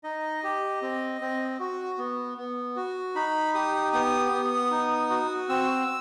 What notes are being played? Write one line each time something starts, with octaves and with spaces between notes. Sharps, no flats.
D#4 D#5
G4
C4
C4
F#4
B3
B3
F#4
D#4 B5
G4 D#6
B3 D#6
B3
D#4
F#4
C4 E6